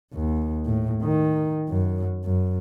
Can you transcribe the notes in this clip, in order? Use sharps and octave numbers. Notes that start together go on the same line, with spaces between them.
D#2
A2
D#3
F#2
F#2